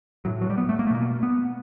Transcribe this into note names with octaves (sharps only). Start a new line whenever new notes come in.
A2 F#3
F#3
G3
B3
A3
A#3
A3
B2 A#3
B3